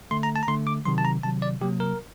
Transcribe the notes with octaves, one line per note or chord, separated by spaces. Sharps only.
D3 A3 C6
A#5
A5
A#5
D3 A3 C6
D6
C3 D#3 F#3 C6
A5
A#5
C3 D#3 F#3 A5
D5
C3 F#3 A#3 G4
A#4